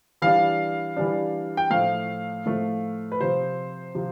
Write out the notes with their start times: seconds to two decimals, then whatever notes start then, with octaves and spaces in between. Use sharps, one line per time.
0.22 E3 G3 D4 F5
0.96 E3 G3 D4
1.57 G5
1.70 A2 F3 A3 F5
2.46 A2 F3 A3
3.12 B4
3.20 C3 F3 C4 C5
3.95 C3 F3 C4